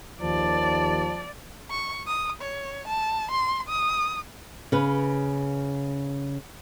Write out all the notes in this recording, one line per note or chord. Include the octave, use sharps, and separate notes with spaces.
D#2 F3 D5 A5
C#6
D#6
C#5
A5
C6
D#6
C#3 B4